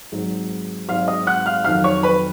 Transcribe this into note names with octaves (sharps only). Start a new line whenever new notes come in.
G#1 G#2 F#3
G#1 G#2 F#3 F5 F6
D#5 D#6
F#5 F#6
F5 F6
F2 D#3 F#3 F5 F6
C#5 C#6
B4 B5